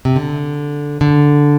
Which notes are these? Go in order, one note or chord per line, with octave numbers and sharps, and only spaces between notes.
C3
D3
D3